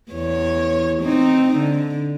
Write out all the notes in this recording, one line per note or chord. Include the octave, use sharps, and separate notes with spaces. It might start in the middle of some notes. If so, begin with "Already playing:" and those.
E2 C#5
C4 D#4
D3